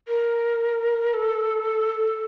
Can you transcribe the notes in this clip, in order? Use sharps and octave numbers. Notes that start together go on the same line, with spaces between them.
A#4
A4